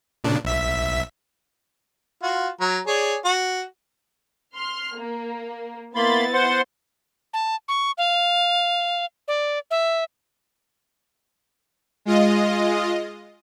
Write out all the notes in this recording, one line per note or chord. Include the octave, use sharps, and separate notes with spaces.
A#2 C#3 D4
B1 E5 B6
F4 F#4
F#3 A#5
G#4 C#5 D5
F#4
C6 F6
A#3
A#3 B3 E4 B5 C6 A6
C5 F#5 C6
A5
C#6
F5
D5
E5
G#3 F4 D#5